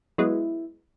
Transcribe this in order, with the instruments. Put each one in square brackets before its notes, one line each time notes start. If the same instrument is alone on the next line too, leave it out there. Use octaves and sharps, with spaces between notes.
[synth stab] F#3 G#3 B3 [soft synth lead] E4